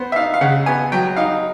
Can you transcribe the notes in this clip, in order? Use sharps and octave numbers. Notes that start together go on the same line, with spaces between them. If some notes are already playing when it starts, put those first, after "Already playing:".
Already playing: B3 C5
E5
D#4 F5
F5
C#3 F#5
B3 G#5
F#3 G5
D#4 F5